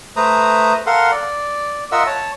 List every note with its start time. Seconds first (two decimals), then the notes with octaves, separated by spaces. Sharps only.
0.16 A3 B4 C5 A#5 D#6
0.86 A4 A#4 F5 F#5 C6
1.12 D5
1.92 F4 A#4 D#5 E5 F#5 E6
2.07 C#5 A5